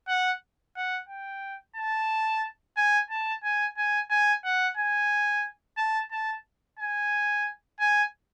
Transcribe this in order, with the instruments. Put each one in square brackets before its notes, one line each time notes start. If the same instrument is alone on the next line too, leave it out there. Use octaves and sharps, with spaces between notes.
[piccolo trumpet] F#5
F#5
G5
A5
G#5
A5
G#5
G#5
G#5
F#5
G#5
A5
A5
G#5
G#5